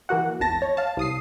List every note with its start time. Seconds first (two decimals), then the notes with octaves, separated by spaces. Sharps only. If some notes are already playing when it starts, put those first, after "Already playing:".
0.09 E3 A#3 F#4 F#5
0.40 G#1 E2 A5 A#6
0.62 C#5
0.77 F5 A5
0.97 C2 D#6 C7